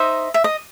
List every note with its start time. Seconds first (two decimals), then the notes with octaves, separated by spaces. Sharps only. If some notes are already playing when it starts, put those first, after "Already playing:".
Already playing: D#4 C5 D#5 E5
0.34 E5
0.44 D#5